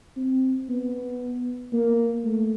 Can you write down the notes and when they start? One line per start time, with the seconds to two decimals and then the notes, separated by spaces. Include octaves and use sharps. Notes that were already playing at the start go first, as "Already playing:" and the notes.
0.16 C4
0.69 B3
1.73 A#3
2.25 A3